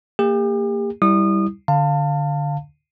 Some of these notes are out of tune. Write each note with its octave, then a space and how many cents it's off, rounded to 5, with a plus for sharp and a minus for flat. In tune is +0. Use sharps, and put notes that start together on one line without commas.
A#3 -25 G4 +40
G3 +0 E4 -20 D#6 -30
D3 +0 F5 +5 A5 +30